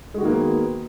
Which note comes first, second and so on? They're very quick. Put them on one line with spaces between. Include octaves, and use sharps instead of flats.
G#3 F#4 D#3 A#3 B3